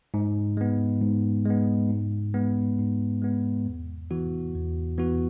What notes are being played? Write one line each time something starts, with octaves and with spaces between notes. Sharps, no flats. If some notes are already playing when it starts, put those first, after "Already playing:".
G#2
G#3 B3
G#2
G#3
B3
G#2
G#3 B3
G#2
G#3 B3
E2
E3 B3 F#4
E2
E3 B3 F#4